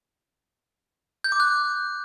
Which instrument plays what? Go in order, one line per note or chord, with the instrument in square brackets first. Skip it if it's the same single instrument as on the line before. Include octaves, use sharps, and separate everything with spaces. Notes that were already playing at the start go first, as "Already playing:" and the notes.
[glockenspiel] G6
D6
F#6